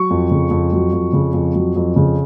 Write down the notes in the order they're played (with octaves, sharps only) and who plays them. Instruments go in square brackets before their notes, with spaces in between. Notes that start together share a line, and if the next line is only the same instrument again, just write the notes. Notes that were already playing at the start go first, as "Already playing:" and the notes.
Already playing: [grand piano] F#3 C#6
F2
C#3
F2
F#3
F2
C#3
F2
F#3
F2
C#3